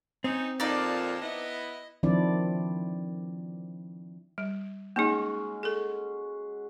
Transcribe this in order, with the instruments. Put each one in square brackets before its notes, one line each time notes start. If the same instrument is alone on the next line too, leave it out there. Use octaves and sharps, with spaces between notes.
[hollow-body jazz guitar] C4 [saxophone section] C#4 D#4
[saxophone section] F2 A#2 [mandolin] D#4 D5 [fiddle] F5 A5
[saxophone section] B3 E4 [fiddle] D#5
[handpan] D#3 F3 C4 D4 E4 D5
[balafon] G3
[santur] G#3 C#4 F#4 [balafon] A#3 D#4
[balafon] G#4 A4